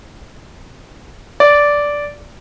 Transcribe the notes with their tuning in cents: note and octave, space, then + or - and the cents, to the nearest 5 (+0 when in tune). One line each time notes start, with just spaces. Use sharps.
D5 -10